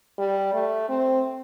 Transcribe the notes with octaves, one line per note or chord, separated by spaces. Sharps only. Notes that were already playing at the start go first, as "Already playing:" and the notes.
G3
A3
C4